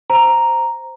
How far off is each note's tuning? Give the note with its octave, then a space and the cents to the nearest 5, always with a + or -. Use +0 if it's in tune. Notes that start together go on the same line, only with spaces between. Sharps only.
C5 +0 A#5 +0